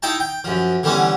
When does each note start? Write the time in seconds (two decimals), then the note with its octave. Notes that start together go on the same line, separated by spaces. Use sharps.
0.03 D#4 E4 G5 A5
0.20 G5
0.44 F#2 F3
0.83 D3 E3 G3 B3 C#4